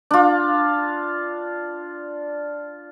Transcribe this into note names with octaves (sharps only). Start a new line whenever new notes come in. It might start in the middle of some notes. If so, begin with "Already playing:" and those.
D4 F4